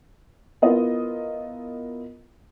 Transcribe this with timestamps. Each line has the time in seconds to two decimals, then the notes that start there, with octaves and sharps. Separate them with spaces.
0.62 B3 E4 F4 A#4 D#5